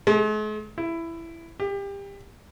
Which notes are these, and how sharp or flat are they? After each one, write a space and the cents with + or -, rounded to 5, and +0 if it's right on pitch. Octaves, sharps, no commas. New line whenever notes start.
G#3 +45
E4 +10
G4 +25